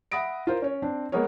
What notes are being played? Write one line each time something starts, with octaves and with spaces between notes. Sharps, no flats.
E5 F#5 B5 D#6 A#6 D7
F4 A#4 C5
C#4 C#5
C4 D4
G#3 A#3 B3 G#4 A#4 C#5